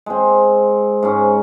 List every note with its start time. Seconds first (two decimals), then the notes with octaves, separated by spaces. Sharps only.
0.06 G#3 C4
1.03 G#2 C#4